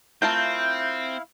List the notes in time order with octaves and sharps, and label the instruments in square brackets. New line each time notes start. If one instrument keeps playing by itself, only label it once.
[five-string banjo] A3 F4 A#4 [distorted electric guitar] C4 [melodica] E4 F5 [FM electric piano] G6